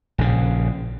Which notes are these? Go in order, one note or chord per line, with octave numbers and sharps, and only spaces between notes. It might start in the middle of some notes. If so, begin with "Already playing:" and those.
A#1 C#3